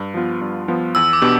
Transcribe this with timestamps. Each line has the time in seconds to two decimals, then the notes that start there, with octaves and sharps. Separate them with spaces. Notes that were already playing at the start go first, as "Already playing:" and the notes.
Already playing: G2
0.14 F3 B3 F4
0.41 G2
0.68 F3 B3 F4
0.95 E2 E6
1.13 D6
1.22 B2 B3 D4 G4